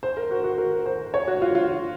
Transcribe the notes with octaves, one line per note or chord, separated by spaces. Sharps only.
C5
A#4
F#4
F#4
A#4
C5
C#5
F#4
F4
F4